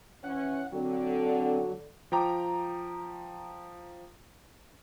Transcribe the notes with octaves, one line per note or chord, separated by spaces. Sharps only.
E3 C#4 F#5
D3 F#3 C4
F3 G5 A#5 D6